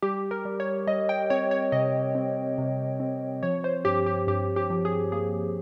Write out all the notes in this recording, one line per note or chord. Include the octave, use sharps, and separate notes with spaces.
G3 G4
A#4
G3
C#5
G3 D#5
G5
C4 C#5
C#5
C3 D#5
C4
C3
C4
F3 C#5
C5
G2 G4
G4
G2 G4
G4
F3
G#4
A#3 G#4